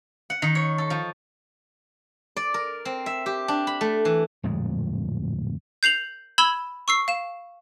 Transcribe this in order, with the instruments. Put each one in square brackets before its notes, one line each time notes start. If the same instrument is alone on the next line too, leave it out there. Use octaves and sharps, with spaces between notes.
[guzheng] F#5
D#3
C#5
A4
F3
D5
A#4
C4
E5
G4
D4
B5
A3
E3
[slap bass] D1 F2 A#2 G#3
[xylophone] G6 C7 F7 F#7
B5 E6 G#6 E7 G7
C#6 E6 C7
F5 E7